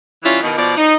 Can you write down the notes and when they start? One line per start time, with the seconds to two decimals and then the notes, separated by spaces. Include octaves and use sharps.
0.23 E3 G3 C#4 E4 F4
0.43 B2 D#3
0.56 B2 F3 D5
0.77 D#4